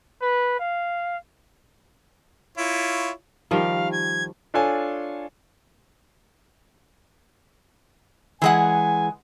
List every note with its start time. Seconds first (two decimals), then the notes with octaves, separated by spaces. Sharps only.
0.22 B4
0.59 F5
2.58 E4 F4 C#5
3.51 D#3 F3 G3 F5
3.92 G#6
4.54 D4 F4 A4 C#5 G#5
8.42 E3 G#3 F#5 G#5